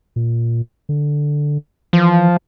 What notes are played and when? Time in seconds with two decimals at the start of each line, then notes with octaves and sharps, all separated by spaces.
0.16 A#2
0.89 D3
1.93 E3 F3